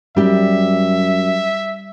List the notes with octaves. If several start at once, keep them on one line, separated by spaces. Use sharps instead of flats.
F#2 G3 G4 E5